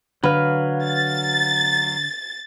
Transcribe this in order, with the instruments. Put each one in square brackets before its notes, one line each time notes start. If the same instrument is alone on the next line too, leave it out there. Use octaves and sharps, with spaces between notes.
[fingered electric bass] D3 [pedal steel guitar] F#3 F5 [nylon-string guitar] B4
[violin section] A6